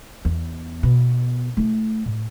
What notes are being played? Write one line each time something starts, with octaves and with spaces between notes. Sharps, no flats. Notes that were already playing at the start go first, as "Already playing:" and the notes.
E2
B2
A3 E4
A2